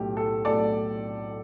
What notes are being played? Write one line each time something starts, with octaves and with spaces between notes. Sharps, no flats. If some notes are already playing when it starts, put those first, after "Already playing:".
Already playing: B1 A2 A3 G4
A4
B1 A2 A3 A4 D5